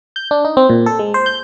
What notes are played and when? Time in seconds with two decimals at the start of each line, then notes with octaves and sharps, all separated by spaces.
0.16 G6
0.31 D4
0.45 D#4
0.57 C4
0.69 A#2
0.86 A4
0.99 G#3
1.14 C5
1.26 G6